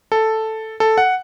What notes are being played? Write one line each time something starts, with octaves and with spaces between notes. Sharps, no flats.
A4
A4
F#5